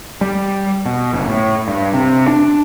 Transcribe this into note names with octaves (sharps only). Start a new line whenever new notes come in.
G3
B2
F#1
A2
G2
C3
D4